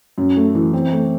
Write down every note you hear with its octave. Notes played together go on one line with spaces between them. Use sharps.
F#2
A3
E3
C4
A3